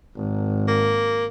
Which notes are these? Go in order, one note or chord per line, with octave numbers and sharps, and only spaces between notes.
G#1
A#3